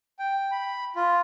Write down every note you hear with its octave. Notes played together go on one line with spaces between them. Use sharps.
G5
B5
F4